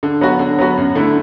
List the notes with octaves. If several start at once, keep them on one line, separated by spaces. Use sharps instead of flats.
D3
F#3 B3 F#4
D3
F#3 B3 F#4
F#2
D3 A3 E4